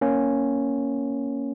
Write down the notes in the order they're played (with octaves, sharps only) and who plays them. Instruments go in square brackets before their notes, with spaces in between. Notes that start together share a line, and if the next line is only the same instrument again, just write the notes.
[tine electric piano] A#3 C#4